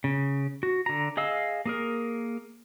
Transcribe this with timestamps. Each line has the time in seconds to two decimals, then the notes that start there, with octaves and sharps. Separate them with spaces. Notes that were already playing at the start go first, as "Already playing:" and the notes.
0.04 C#3
0.63 F#4
0.86 D3 A#5
1.17 G#4 D#5 F5 E6
1.66 A#3 G#4 A#4